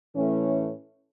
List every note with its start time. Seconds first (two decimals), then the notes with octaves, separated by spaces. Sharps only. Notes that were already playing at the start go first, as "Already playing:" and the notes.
0.16 A2 E3 A3 C#4